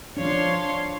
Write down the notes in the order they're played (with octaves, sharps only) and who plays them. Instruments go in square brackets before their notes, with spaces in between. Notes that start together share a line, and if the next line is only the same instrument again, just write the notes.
[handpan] F3 D4 [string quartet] C#5 F5 C6